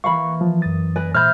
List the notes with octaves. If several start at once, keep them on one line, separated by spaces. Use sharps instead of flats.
E3 A#3 B4 F5 B5 C#6
F3
F#2 D#6 A6
B4 D5 G#5 A#6
A#2 C5 D#5 E5 B5 F6 G6 A6